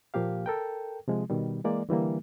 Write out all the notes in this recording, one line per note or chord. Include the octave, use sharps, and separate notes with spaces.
A#2 F3 A#3 G4 F5
A4 A#4 G5
C3 F3 G#3
B2 D#3 G3
E3 G#3 A#3 D5
D3 E3 G3 A#3